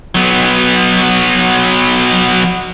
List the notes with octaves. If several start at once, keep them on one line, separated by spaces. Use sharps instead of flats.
F#3 B3